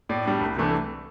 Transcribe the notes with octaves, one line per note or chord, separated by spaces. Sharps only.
A2 D5
G3 D4
C2
C3 E3 A3 D4